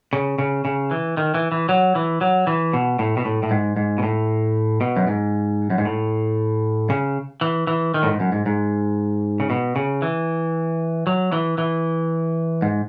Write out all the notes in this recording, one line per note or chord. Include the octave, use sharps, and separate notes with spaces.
C#3
C#3
C#3
E3
D#3
E3
E3
F#3
E3
F#3
E3
B2
A2
B2
A2
A2
G#2
G#2
B2
A2
B2
F#2
G#2
F#2
G#2
A2
C#3
E3
E3
D#3
A2
G#2
F#2
G#2
G#2
C#3
B2
C#3
E3
F#3
E3
E3
G#2